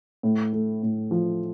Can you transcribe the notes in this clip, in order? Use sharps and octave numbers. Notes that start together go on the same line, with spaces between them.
A2
A3
A2
F3